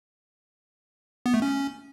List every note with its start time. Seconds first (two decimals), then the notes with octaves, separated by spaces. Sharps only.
1.26 B3
1.34 A3
1.42 C#4